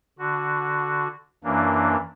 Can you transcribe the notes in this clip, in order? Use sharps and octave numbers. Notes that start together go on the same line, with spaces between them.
D3 F#4
F#2 E3 A#3 D4